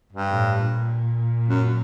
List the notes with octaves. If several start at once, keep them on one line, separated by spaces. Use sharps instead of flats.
G2
A2
A#2
F#2